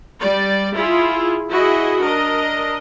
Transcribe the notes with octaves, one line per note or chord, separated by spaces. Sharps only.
G3 D5
E4 F4 G#4
E4 F#4 G#4 D#5
D4 A#4 D#5